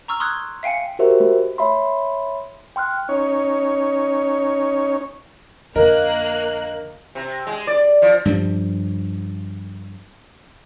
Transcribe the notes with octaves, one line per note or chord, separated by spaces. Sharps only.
A#5 C#6 E6 F6
C6 D#6 F6 F#6 G#6
E5 F5 G5 G#5 C#7
F#4 G4 A#4 C5 E5
A3
C#5 E5 B5 C6
G5 C6 F6 F#6
C#4 D#4 C#5
F2 D3 A#3 A#4 D#5 F#6
C3
G#3
D5
F3
G2 F3 G3